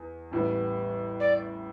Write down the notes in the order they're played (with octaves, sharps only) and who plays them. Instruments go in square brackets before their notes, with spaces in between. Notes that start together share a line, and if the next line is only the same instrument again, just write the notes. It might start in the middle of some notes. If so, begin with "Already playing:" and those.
Already playing: [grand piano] E2
A1 A2 E3 G3 B3
[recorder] D5